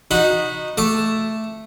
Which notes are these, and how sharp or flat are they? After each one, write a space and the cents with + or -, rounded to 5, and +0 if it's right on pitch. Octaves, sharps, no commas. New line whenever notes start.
D#4 -10 F#4 -20 B5 +0
A3 +0 A5 +0 D6 +0